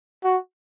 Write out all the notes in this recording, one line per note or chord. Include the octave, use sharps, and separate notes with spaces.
F#4